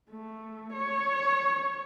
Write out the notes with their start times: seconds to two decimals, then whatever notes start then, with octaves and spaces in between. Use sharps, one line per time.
0.10 A3
0.73 C#5